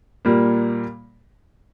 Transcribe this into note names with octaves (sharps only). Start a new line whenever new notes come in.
A#2 G3 A#3